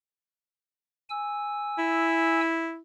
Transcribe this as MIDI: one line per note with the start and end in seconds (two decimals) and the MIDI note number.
1.10 2.41 80
1.10 2.41 88
1.78 2.80 64